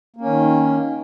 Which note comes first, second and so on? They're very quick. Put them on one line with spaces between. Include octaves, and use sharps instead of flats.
A#3 C#4 D#3